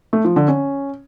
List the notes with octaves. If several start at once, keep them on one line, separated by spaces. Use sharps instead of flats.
A3
F3
D3
C#4